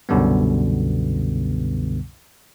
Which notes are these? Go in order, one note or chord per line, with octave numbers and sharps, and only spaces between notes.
C2 F#2 B2 D3 G3 B3